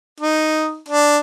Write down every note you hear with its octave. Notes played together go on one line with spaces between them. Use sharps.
D#4
D4